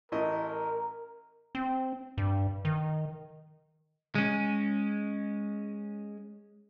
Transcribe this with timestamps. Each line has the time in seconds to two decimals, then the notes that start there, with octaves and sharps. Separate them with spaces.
0.12 A1 E4 A#4 D#5
1.55 C4
2.18 G2
2.65 D#3
4.15 G#3 C#4